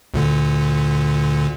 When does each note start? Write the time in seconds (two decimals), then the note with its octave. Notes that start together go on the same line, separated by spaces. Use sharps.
0.14 D2 A#2 D3